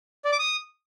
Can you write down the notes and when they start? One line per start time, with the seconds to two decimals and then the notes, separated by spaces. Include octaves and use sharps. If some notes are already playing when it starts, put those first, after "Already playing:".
0.25 D5
0.32 D6
0.39 D#6